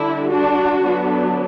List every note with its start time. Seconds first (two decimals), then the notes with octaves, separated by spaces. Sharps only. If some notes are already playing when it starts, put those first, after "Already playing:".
Already playing: D3 G3 D4 E4
0.30 D4 F#4
0.82 D3 F#3 B3 D4